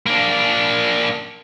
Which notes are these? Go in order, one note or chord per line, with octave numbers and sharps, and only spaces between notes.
A#3 D4